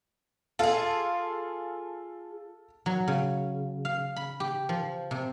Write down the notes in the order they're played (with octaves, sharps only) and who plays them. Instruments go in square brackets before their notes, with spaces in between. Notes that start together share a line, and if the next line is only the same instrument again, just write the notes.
[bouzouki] F4 G#4 [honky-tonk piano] A4 F5
[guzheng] F#3
C#3
F5
B5
G4
F3
C3